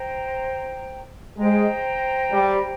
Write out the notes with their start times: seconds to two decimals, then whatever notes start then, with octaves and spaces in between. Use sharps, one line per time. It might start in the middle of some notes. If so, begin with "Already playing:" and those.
Already playing: C5 G5 A#5
1.38 G#3 C5 G5 A#5
2.32 G3